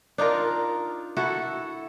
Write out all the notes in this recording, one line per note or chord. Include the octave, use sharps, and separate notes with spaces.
D4 D#4 F4 A#4
E4 F#4 A4